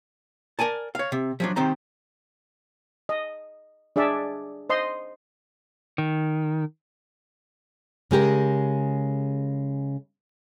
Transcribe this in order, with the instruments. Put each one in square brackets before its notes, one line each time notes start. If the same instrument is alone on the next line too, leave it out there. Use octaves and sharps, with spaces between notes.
[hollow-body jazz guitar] A#4 D5 G#5 A5
C#5 F5
C3
F3 F#3 D4
D#3 C4 G4 C5 A#5
[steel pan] D#5
D4 G#4 D5 E5
C5 D#5 C6
[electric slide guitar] D#3
[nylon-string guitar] C#3 G#3 G4 A#4